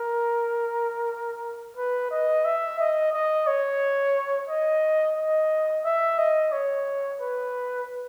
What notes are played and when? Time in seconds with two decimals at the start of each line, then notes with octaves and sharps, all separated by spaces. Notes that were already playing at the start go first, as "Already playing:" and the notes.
Already playing: A#4
1.77 B4
2.11 D#5
2.45 E5
2.79 D#5
3.13 D#5
3.47 C#5
4.49 D#5
5.17 D#5
5.85 E5
6.18 D#5
6.52 C#5
7.21 B4